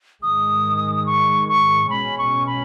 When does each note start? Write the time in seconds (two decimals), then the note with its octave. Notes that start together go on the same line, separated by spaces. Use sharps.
0.23 G#2 D#3 G#3 D#6
1.06 C#6
1.49 C#6
1.90 B2 G#3 C#4 B5
2.18 C#6
2.47 B5